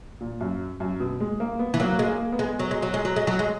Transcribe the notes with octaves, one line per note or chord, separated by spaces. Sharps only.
A#2
F#2
F#2
B2
G#3
A#3
B3
E3
F#3 A#3
G#3
A#3
B3
G#3
F#3
G#3
F#3
G#3
F#3
G#3
F#3
G#3